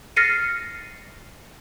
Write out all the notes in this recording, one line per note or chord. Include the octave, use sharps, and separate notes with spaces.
F6 A6 A#6 C7 C#7 D#7